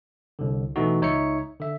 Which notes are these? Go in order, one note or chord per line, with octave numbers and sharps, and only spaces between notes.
C2 D3
B2 E3 A3 D#4 F#4
C#2 D#4 C#5 E5 C#7
D3 E5